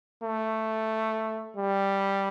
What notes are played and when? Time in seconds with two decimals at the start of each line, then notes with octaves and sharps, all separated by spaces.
0.23 A3
1.56 G3